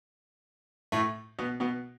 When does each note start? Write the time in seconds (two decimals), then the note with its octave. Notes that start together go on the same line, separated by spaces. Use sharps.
0.92 A2 A3
1.39 B2 B3
1.60 B2 B3